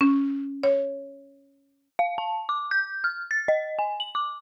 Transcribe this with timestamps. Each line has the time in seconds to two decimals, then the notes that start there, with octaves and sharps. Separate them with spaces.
0.01 C#4
0.63 C#5
1.99 F5
2.18 A5
2.49 D6
2.71 G6
3.04 F6
3.31 A6
3.48 D#5
3.79 G#5
4.00 F#7
4.15 D6